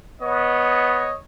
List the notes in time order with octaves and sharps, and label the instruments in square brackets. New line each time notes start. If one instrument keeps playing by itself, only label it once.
[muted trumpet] B3 [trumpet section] C#5 D#5